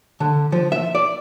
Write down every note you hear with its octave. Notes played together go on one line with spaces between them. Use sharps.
D3
F3
E5
D5